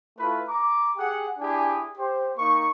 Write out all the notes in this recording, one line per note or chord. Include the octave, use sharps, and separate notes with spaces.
A3 E4 F4 B4
A#5 D6
G4 G#4 F#5
D4 E4 G4 G#4 G#5
G4 C5
A#3 D#4 C#6